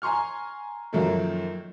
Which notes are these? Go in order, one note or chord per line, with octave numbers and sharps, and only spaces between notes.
G#5 A#5 C6 C#6 F6
F#2 D#3 F3 F#3 A3 A#3